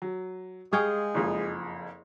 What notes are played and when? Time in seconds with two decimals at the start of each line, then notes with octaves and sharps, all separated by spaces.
0.02 F#3
0.73 G#3 G#4 F5 G5 C#6
1.15 F#1 F2